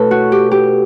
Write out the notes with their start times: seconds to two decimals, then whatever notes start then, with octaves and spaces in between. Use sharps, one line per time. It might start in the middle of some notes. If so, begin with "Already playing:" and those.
Already playing: B2 A3 E4 A4 B4 C#5
0.11 F#4
0.32 G4
0.51 G4